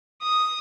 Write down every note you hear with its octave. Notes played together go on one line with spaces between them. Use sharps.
D#6